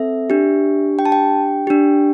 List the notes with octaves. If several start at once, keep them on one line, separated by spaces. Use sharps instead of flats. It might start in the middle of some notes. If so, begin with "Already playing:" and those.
Already playing: C4 A4 E5
D4 G4
G5
A5
G5
D4 G4